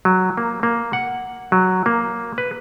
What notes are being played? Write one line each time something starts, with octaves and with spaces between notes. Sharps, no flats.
F#3
A#3
A#3
F#5
F#3
A#3
B4